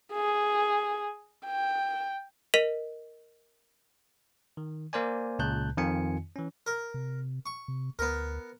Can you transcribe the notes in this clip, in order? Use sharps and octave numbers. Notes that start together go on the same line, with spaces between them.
G#4
G5
A#4 D#5 B6 D#7 F7
D#3
A#3 A#4 C5 D5 G#5
C#2 A#2 C#3 A5 F#6 G6
F2 D#3 C4 F4 G#5 C#7
E3 C#4
A#4
C3
C#6
C3
D2 B3 A#4